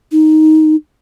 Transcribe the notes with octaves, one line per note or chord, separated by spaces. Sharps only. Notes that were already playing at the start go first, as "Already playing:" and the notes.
D#4